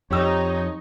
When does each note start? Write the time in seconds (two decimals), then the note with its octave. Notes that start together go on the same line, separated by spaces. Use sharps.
0.11 F2 D#4 G4 C#5 E6